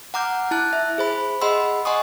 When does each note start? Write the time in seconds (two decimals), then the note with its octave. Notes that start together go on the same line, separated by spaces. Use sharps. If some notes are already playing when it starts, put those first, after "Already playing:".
0.14 F#5 A#5 D6 F6 G6
0.51 E4 A5 F#6
0.73 E5
0.98 G#4 C5 B5
1.41 G#4 D#5 F#5 B5 C6 E6
1.85 D#5 F#5 G#5 C6 C#6 D#6